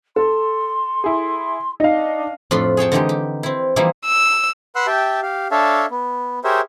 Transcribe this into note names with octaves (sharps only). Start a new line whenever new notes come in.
A4 C6
E4 G#4
D4 D#4 D#5 F5
F2 A2 D4 F4 B5 C6
G#4 C#5 G5 A5
D3 E3 G#3 D#4 G4
G4
C4 E4
E3 F3 G3 A#3 D#4 E4
E6
B4 F#5 C6 E6 F#6
G4 E5 G5 A5
G4 F5
D4 A4 C#5 E5 F5 A5
B3
G4 G#4 A#4 C5 C#5 E5